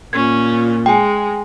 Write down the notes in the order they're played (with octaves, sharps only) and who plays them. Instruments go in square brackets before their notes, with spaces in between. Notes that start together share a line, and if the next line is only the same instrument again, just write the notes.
[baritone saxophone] A#2 [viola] C#4 [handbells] G#6
[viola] G#3 [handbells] G5 G#5